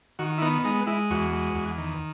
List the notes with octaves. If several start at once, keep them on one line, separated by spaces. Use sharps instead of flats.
D#3 F#4
E4
B3 D#4
G#3 D#4
G#3 E4
E2 F#4
G#3
E2
D#3